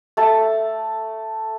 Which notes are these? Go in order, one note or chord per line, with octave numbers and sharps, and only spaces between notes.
A3 A5